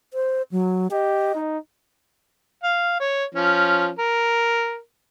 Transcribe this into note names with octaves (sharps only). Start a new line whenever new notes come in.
C5
F#3
G4 D#5
D#4
F5
C#5
F3 C#4
A#4